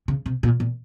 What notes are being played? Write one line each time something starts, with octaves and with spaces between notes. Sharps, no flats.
C#3
C3
A#2
A#2